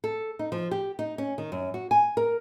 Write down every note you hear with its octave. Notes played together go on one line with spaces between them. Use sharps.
A4
D#4
F3
G4
D#4
C#4
D#3
F#2
F#4
G#5
A#4